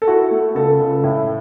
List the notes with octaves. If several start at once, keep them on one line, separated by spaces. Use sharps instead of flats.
A4
E4 F#4
A3
C#2 A4
C#2
A2